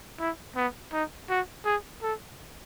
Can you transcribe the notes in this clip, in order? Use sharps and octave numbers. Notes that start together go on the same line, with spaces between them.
E4
B3
D#4
F#4
G#4
A4